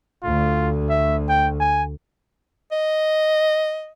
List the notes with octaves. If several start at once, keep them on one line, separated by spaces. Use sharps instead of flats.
D2 F4
E5
G5
G#5
D#5